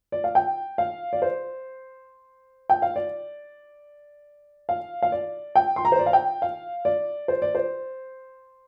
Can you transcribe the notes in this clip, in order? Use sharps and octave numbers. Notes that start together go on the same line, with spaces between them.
D5
F5
G5
F5
D5
C5
G5
F5
D5
F5
F5
D5
G5
C6
A#5
C5
D5
F5
G5
F5
D5
C5
D5
C5